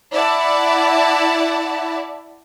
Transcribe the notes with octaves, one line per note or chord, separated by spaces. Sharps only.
E4 D5 E5 F#5 A5